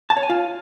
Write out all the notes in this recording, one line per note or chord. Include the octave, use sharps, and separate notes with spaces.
A5
C#5
G#5
F4